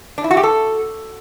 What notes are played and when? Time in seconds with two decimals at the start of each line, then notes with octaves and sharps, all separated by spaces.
0.18 D4
0.24 E4
0.31 F#4
0.37 G4
0.43 A4